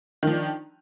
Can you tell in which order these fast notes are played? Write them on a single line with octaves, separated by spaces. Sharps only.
D#3 F3 D4